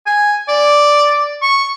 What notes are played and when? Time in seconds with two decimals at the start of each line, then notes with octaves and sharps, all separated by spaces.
0.07 G#5
0.48 D5
1.42 C#6